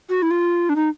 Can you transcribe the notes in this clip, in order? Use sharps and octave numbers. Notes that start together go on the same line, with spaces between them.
F#4
E4
F4
D4
D#4